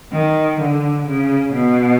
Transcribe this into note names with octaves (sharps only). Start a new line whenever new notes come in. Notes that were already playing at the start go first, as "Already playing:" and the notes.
D#3
D3
C#3
B2